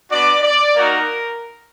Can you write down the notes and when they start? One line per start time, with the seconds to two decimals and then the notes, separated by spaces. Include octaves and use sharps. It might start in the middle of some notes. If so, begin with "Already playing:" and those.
0.10 B3 D4 F#4 D5
0.42 D5
0.76 A#3 D#4 F#4 A#4